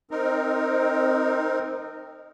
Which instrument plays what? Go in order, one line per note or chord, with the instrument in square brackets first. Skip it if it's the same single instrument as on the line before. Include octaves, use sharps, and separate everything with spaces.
[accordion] C4 D#4 A#4